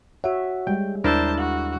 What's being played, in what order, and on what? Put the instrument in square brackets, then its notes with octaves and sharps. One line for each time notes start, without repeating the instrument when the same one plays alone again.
[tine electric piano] F#4 F#5 [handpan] C#5 E5
[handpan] G3 G#3 [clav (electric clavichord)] G5
[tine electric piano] D#2 E6 [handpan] D4 [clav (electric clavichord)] E4 A#4 D5 [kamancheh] C5 A5
[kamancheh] F#4